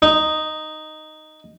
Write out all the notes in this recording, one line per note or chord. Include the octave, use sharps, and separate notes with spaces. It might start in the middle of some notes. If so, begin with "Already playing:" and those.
D#4